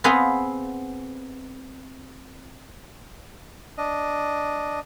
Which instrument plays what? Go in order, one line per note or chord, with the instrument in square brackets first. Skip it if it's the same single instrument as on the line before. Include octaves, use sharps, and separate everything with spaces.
[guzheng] B3 C4 G#4 B4 C5 F5
[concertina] D4 D#5